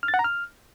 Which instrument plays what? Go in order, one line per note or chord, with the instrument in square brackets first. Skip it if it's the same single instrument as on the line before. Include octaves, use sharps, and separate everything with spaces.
[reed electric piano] F6
A6
F#5
A#5
F6